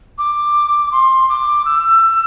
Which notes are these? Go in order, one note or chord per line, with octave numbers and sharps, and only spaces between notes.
D6
C6
D6
E6